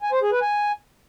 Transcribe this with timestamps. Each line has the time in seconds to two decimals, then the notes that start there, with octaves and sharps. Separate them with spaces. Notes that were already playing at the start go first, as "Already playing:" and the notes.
0.02 G#5
0.12 C5
0.22 G#4
0.32 B4
0.42 G#5